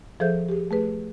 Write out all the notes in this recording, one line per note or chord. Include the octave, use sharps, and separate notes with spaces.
F3 G#4 A4 C5 E5 G6
G4 G#4
A3 G#4 B4